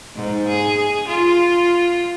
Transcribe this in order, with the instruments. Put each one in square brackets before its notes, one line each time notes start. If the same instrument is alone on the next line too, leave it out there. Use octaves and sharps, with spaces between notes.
[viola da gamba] G#2
G#4
F4